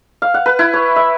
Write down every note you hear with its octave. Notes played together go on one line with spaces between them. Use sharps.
F5
F#5
B4
E4
C#5
E5